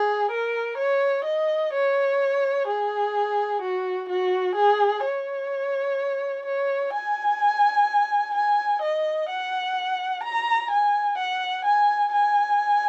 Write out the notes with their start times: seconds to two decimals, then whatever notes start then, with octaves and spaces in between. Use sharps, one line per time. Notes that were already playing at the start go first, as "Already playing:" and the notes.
Already playing: G#4
0.31 A#4
0.78 C#5
1.25 D#5
1.73 C#5
2.68 G#4
3.62 F#4
4.09 F#4
4.56 G#4
5.04 C#5
6.46 C#5
6.93 G#5
8.35 G#5
8.82 D#5
9.30 F#5
10.24 A#5
10.71 G#5
11.18 F#5
11.65 G#5
12.12 G#5